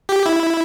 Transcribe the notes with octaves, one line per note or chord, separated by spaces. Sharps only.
G4
E4